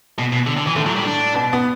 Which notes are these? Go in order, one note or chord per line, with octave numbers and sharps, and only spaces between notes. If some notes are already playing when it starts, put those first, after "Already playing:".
B2
B2
D3
D3
E3
A2 D3 A3
F#3
G3
D4
B2 B3
B3